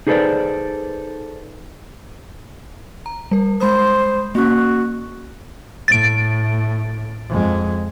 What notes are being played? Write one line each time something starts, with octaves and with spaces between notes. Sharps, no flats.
D#4 G#4 A4 B4 C5 D5
A#5
G3 A#4
G#3 C5 B5 D#6
A#3 C#4 F#4
A2 A6 D7
F2 G#3